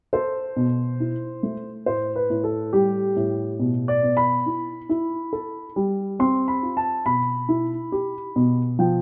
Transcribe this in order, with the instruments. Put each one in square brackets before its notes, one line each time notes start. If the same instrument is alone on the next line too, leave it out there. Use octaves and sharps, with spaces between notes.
[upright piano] A4 [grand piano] C5
[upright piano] B2
E4
A3
[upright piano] A2 [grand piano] C5
[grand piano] B4
[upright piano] A2
[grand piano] A4
[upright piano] G3 [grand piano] G4
[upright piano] A2
B2
[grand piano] D5
[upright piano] B3
[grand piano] B5
[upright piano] E4
E4
A4
G3
[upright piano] C4 [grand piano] C6
[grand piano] B5
[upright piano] F4
[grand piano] A5
[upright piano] B2 [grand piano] B5
[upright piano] E4
G4
B2
[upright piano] F3 [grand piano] G5